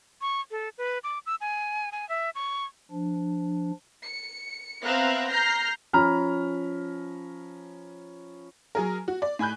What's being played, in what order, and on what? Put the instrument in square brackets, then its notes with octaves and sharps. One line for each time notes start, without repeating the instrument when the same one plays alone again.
[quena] C#6
A4
B4
D6
E6
G#5
G#5
E5
C#6
[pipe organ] F3 D4
[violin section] C#7
B3 C4 E5 F5 A#5 F#6
A#5 F6 G6 A#6 C7
[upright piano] F3 C#4 A#5 B5 F6
[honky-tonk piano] F#3 G#4 A#4
F#4
D5
A2 G#5 B5 F#6 G6